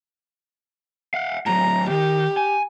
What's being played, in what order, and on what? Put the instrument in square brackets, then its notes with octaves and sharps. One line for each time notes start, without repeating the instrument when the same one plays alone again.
[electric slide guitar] F5 F#5
[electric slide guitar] A2 F#3 [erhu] A#5
[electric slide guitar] D#3 [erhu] G4
[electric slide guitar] G#5